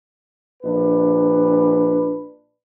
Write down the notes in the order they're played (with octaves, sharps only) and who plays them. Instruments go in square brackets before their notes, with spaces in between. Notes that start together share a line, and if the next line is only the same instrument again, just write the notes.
[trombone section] A#1 D4 B4